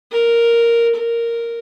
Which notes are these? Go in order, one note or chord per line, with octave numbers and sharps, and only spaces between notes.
A#4
A#4